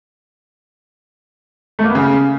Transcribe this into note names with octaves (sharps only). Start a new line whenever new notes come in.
A3
A#3
B3
C#3